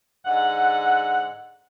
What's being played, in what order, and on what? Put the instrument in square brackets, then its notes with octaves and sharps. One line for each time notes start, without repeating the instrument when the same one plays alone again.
[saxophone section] G#2 D3 F#5